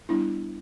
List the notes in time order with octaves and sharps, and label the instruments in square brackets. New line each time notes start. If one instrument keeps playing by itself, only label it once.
[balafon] G3 B3 D4 E4